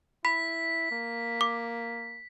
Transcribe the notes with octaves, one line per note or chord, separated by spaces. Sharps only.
E4 B5 B6
A#3
D6